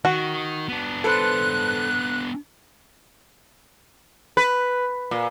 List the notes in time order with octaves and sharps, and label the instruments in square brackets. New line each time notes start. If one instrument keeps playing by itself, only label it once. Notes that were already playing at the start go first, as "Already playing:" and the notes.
[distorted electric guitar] D#3 [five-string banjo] F#4
[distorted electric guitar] B3 D4
[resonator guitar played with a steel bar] A4 B4 C5 [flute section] F#6
[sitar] B4
A#2